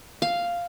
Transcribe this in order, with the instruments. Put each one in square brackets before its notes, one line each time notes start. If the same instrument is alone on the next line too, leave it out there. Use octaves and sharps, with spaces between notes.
[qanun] F5